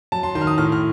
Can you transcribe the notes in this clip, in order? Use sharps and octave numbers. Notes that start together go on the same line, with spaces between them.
F#3 A5
C6
D#3 C6
F6
D#6
A2 F6
F6